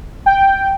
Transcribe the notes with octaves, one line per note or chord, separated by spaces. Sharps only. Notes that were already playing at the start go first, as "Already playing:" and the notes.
G5